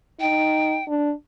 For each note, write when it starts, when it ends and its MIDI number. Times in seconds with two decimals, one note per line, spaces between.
0.20 0.78 63
0.20 0.84 79
0.88 1.13 62